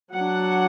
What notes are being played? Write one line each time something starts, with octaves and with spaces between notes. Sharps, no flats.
F#3 D4 F#5